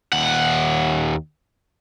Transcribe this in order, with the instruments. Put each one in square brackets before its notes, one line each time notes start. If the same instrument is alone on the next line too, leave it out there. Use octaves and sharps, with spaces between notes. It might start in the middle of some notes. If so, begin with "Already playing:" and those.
[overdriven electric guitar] D#2 F#5